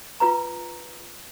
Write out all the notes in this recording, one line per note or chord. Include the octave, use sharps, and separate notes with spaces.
F4 B4 A#5